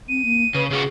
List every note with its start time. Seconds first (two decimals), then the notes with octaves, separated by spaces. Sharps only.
0.09 C4 D#7
0.25 A#3
0.55 C#3 B4
0.71 C#3 F4 F#4 G#4